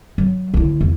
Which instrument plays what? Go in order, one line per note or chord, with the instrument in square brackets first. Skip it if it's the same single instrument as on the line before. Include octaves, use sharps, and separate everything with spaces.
[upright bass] F#3
D2 E4
E2